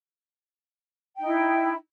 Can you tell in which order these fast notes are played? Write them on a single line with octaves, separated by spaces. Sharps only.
G5 D#4 E4